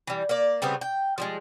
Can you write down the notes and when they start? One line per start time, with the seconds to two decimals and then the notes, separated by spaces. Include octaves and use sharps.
0.07 E3 G3
0.29 A#3 D5
0.62 C#3 G3 B3 C4
0.81 G5
1.18 F3 G3 G#3